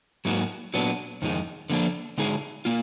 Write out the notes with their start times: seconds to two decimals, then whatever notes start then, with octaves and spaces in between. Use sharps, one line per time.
0.25 G#2 F#3 A#3 D#4 F#4
0.74 A#2 F#3 B3 D4
1.22 F2 D#3 G#3 D#4
1.70 D3 F3 A#3 D4
2.18 D3 G#3 D#4 G#4
2.65 A#3 F4